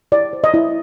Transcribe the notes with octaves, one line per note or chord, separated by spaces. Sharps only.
E4 D5
C5
D#5
E4